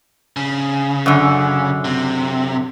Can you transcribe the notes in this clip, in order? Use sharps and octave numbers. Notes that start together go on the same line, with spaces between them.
C#3
F#2 D3
C3